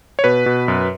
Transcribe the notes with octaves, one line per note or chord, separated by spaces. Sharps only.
C#5
B2 B4
B2
F#2